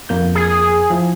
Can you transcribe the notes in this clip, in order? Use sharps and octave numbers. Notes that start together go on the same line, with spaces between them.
F2 A#3 G6
G#4
F3 E4